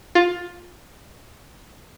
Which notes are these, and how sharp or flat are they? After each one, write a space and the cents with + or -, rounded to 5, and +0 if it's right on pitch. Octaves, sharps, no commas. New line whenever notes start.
F4 +15